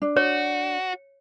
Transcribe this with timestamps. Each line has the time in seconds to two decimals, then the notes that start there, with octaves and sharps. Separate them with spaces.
0.02 D4
0.17 F#4 C#5